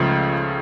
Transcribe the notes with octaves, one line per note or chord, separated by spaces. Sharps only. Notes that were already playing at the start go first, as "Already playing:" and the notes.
Already playing: C#2 C#3 F3 A3